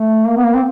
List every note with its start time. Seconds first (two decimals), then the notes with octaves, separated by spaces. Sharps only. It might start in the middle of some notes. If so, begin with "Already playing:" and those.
Already playing: A3
0.27 A#3
0.37 B3
0.44 A#3
0.55 C4